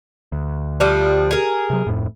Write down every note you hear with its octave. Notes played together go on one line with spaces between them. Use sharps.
D2
F3 G3 D4
G#4 A#4
C3 F#3
D1 F2 A2